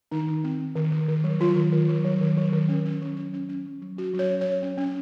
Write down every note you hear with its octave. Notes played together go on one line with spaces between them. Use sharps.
D#3 D#4
D#3
C4
C4
D#3
D#3
D#3
F#3
F#3 F4
D#3
D#3
F#3
F#3
D#3
F#3
D#3
C#4
C#4
F#3
C#4
C#4
C#4
F#3
F#3
C#4 F#4
F#3
C#5
C#4
F#3 C#5
C#4
C#4